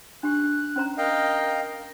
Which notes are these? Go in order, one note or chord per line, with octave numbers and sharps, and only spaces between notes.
D4 G4 F#6
C#4 C5 A#5
A#4 D#5 F5 G5